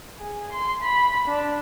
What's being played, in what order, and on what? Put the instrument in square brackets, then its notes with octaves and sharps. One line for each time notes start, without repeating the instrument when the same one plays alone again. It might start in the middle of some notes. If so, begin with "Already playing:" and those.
[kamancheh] G#4
C6
B5
D4